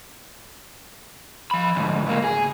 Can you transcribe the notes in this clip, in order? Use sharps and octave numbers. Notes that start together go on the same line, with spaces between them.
F3 B5
D2 G#2
C#2 A#3
G#4